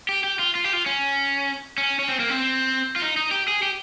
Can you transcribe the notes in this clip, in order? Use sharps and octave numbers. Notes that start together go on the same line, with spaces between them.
G4
G4
F4
F4
G4
F4
C#4
C#4
C#4
C4
A#3
C4
F4
D#4
D#4
G4
G#4
G4